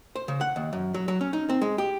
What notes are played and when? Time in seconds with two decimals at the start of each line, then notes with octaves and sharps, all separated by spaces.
0.16 C5
0.28 C#3
0.41 F#5
0.56 D#2
0.73 F#2
0.94 F#3
1.08 F#3
1.21 C#4
1.33 D#4
1.49 C4
1.62 G#3
1.78 G4